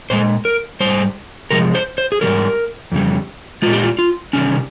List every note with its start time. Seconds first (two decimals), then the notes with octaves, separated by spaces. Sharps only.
0.10 A#2 G#3 C5
0.45 A#4
0.80 G#2 G3 C5
1.51 C3 F3 G#3 A#4
1.75 C5
1.98 C5
2.12 G#4
2.21 G#2 D#3 G3 A#4
2.92 F2 C#3 G3
3.62 A#2 G#3 F4
3.73 G4
3.83 F4
3.99 F4
4.33 C3 D#3 G3 C#4